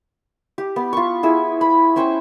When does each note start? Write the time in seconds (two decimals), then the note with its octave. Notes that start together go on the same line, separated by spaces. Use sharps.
0.58 G4
0.76 B3
0.93 F4 C#6
1.23 E4 G#4 E6
1.61 B5
1.96 C#4 C5 G5 C#6